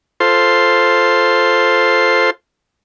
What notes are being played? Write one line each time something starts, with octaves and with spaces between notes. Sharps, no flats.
F4 A4 C5 C6